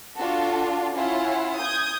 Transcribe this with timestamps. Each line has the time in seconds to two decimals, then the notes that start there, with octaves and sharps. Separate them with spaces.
0.17 D4 F4 F#4 A4
0.94 C#4 E4 F4 F#5
1.58 D#6 G6 G#6